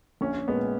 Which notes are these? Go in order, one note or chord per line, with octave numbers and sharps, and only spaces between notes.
A#1 C#4
A#2 G#3 B3